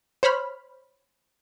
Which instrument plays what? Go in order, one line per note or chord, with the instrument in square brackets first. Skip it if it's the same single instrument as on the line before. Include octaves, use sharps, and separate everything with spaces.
[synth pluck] C5 C#5 B5 F6